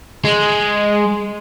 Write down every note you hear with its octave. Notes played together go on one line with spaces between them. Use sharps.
G#3